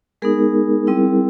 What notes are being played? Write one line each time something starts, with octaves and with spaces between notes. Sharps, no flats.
G#3 B3 D#4 G#4 A#4
G3 C4 E4